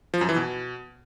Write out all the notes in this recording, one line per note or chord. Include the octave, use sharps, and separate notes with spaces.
F3
F#2
E3
B2